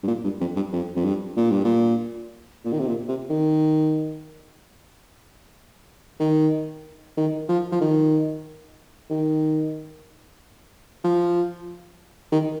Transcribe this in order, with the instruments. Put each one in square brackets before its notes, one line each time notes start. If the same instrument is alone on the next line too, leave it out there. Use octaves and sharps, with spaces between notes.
[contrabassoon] G2
A#2
G2
F2
G2
F2
F2
G2
A#2
G2
A#2
A#2
D#3
C3
A#2
C3
D#3
D#3
D#3
F3
F3
D#3
D#3
F3
D#3